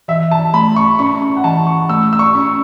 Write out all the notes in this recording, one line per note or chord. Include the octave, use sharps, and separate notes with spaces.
E3 E5
A5
A3 B5
C#6
C#4 C#6
C#6
F#5
E3 A5
C#6
A3 E6
E6
C#6
C#4